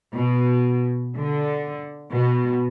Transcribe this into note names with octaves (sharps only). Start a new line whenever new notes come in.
B2
D3
B2